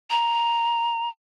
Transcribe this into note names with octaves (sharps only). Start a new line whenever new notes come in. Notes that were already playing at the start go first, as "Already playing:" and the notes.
A#5